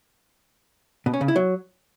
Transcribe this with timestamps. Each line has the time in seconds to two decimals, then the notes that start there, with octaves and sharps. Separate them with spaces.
1.06 B2
1.14 C#4
1.21 C#3
1.28 E4
1.36 F#3